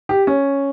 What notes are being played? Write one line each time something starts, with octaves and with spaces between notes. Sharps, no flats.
G4
C#4